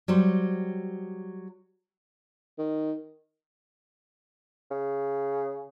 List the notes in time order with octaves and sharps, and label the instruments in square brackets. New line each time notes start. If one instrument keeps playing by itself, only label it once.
[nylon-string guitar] F#3 G3 C5
[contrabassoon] D#3
[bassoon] C#3